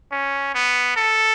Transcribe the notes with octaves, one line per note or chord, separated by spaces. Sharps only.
C#4
B3
A4